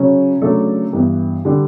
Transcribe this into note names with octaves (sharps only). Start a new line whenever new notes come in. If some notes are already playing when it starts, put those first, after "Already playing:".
Already playing: C#3 F#3 C#4
C#3 F#3 A3 D4 A4
G2 E3 B3
D3 G3 D4